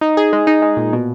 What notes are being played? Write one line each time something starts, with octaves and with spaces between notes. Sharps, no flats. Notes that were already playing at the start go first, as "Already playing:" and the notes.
D#4
G#4
G#3
D#4
G#3
A#2
B2